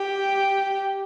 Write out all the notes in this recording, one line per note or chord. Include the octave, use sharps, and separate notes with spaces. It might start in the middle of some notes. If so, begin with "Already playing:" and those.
Already playing: G4